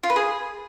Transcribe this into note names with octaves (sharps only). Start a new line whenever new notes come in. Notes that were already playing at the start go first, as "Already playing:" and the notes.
F4
B4
G#4